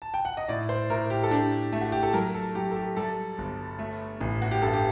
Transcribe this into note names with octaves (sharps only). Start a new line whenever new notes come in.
A5
G5
F#5
D#5
A2 D5
C5
A2 A#4
G4
A4
D4 G4
A3
F#4
G4
A4
F#3 A#4
A4
F#3 G4
A4
G4
G3 A4
G1
A3
A1
F#4
G4
G2 A4
G4